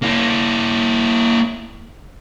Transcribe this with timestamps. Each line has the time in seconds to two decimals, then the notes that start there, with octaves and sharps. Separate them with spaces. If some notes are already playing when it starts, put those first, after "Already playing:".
0.03 A#3 E4